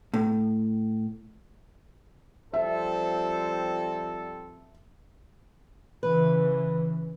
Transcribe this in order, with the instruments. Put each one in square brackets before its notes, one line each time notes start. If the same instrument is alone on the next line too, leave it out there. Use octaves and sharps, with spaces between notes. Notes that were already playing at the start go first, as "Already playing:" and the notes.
[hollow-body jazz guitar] A2
[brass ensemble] F3 G3 C4 [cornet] A4 [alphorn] C5 [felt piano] E5
[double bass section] C#3 E3 [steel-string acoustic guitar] B4